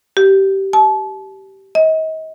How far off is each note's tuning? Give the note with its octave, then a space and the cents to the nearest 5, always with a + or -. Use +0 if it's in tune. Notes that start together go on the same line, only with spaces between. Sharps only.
G4 -20
A5 -35
D#5 +35